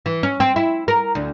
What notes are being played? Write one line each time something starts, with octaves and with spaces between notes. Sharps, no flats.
E3
C#4
C4
E4
A#4
D2